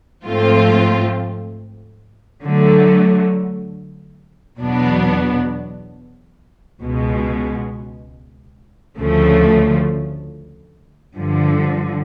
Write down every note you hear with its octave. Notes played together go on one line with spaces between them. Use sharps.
G#2 F3 A3 C4 F4
D3 F#3 A3
E2 B2 F#3 B3 D4
C#2 B2 G#3
D2 C#3 F3 A3
G2 D3 F3